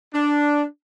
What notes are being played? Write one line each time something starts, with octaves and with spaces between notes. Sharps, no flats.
D4